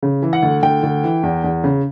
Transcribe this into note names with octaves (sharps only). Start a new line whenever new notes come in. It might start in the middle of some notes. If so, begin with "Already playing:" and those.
C#3
E3
F#5
D2
D2 G5
D2
E3
E2
E2
C#3